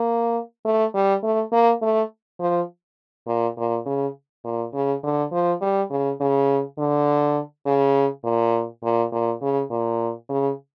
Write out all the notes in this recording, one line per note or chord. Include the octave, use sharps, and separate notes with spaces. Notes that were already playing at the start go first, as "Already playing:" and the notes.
Already playing: A#3
A3
G3
A3
A#3
A3
F3
A#2
A#2
C#3
A#2
C#3
D3
F3
G3
C#3
C#3
D3
C#3
A#2
A#2
A#2
C#3
A#2
C#3